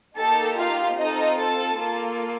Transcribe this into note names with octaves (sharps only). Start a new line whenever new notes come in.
A#3 D#4 G4 A4 A5
F4 F5
C4 D#4 F4 A4 D#5
A4 A5
A#3 F4 A4